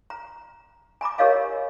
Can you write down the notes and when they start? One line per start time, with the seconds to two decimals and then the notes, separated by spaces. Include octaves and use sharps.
0.10 A#5
1.01 G#5 A#5 B5 D6
1.18 G4 A#4 C#5 D#5 F5 G#5